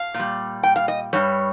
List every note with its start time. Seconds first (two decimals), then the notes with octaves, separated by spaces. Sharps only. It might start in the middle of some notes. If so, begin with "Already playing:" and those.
Already playing: F5
0.14 A#2
0.20 G3
0.63 G5
0.76 F5
0.88 D#5
1.13 G2 G3 C#5